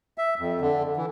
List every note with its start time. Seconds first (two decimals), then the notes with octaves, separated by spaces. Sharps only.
0.18 E5
0.39 F2
0.61 D3
0.97 E3